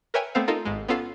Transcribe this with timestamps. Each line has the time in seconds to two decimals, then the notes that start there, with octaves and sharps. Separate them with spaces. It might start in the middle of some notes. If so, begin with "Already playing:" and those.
0.14 A#4 B4 C#5 E5 G5 G#5
0.35 A3 B3 C4 A4 C5 F5
0.48 D#4 F4 A4 A#4
0.65 G#1 G#2 G#3
0.88 B3 C#4 F4 A4 F5